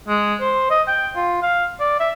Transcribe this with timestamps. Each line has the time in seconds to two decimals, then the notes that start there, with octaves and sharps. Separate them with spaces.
0.08 G#3
0.40 C5
0.70 D#5
0.87 G5
1.15 F4
1.42 F5
1.80 D5
1.99 E5